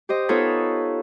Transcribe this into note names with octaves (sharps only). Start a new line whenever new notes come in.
G4 C5 D#5
B3 D#4 F4 A4 B4 C#5